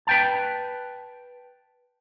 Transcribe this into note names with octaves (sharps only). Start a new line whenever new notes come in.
B4 G5 A5